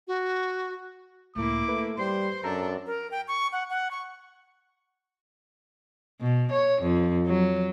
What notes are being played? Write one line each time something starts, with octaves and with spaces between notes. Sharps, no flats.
F#4
C#2 A2 A#3 E4 D6
A3 B4
G3 C5 C6
F#2 D4 A4 A#5
A#4
G5
C#6
F#5
F#5
C#6
B2
C#5
F2
F#3